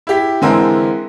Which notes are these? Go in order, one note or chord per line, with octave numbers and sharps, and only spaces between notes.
E4 G4 B6
D3 E3 G#3 C4 E4 A#4